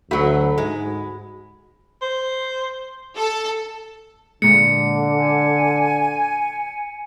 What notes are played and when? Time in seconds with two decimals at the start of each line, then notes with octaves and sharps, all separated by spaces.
0.11 D2 F#3 A3 F#4 B5
0.58 G#2 G#3
2.02 C5
3.18 A4
4.42 A#2 D3 G#3 C#7
5.17 G#5